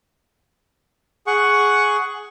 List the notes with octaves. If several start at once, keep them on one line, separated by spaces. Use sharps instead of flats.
G#4 F#5 C#6